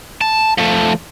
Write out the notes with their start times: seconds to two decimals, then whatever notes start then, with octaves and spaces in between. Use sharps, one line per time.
0.21 A5
0.58 F3 A3